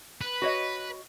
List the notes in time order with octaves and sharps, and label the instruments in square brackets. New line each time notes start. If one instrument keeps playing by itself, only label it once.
[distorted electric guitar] B4
[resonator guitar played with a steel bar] F#4 C#5 D#5